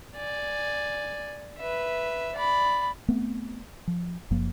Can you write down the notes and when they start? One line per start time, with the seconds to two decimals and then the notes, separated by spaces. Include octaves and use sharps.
0.16 D5 G#5
1.58 B4 E5
2.35 D5 B5
3.08 A3 B3 C4
3.87 F3
4.31 F#1 F#2 F3 A#3